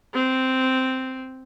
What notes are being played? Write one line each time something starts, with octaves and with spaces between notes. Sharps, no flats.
C4